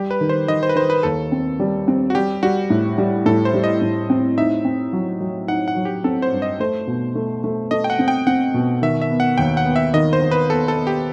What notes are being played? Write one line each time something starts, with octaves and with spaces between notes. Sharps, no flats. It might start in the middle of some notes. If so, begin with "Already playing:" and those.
Already playing: G3 G4
B4
D#3
C5
D#3 D#5
C5
B4
D#3 C5
B4
D#2 A4
C4
G3
C4
F#4
G3 G4
G3 F#4
A2
G3
A2 A4
C5
G3
D#5
A2
C4
D#4 E5
C4
F#3
F#3
D#4 F#5
F#5
F#3
G4
C4 A4
C5
G2
D#5
A3 C5
B2
A3
A3
A3 D#5
G5
F#5
C4
G5
C4 F#5
B2
D#3 E5
E5
B3
F#5
D#2 G5
F#5
B3
E5
D#3 D#5
C5
D#3
B4
B3 A4
A4
B3
G4